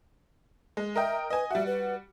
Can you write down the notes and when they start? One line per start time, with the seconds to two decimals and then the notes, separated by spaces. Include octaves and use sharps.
0.77 G#3
0.96 A#4 D#5 E5 G5
1.30 B4 D#5 G#5
1.50 G3 F#4 E5
1.67 B4